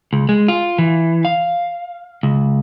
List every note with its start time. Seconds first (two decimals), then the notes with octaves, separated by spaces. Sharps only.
0.13 C#2
0.29 G#3
0.48 F4
0.78 E3
1.25 F5
2.23 C#2